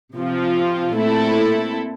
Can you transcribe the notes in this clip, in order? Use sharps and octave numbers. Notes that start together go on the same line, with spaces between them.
C3 F3 C4 F4
A#2 A3 C4 E4 A4